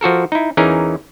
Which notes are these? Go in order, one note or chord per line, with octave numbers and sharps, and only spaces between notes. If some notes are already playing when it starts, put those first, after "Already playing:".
F3 F#4 A4 A#4
D#4 E4
E2 E3 C#4 D#4 G#4 A#4